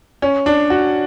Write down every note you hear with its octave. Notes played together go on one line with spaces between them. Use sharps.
C#4
D4
F#4